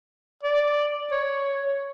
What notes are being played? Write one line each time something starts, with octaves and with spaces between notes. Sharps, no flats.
D5
C#5